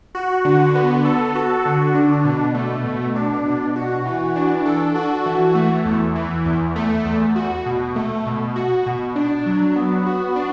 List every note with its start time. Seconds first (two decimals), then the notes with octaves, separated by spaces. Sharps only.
0.15 F#4
0.45 D3
0.75 B3
1.05 A4
1.35 F#4
1.65 D3
1.95 D4
2.25 B2
2.54 A3
2.86 B2
3.15 D4
3.45 B2
3.76 F#4
4.05 E3
4.36 D4
4.65 A4
4.95 F#4
5.26 E3
5.55 A3
5.85 E2
6.15 E3
6.46 E2
6.76 A3
7.06 E2
7.36 F#4
7.66 B2
7.96 A3
8.26 B2
8.56 F#4
8.86 B2
9.16 D4
9.46 F#3
9.76 B3
10.06 F#4
10.36 D4